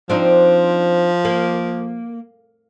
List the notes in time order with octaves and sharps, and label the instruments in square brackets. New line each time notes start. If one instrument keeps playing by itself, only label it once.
[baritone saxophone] F3 [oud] C4 D4 D#4
[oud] A#3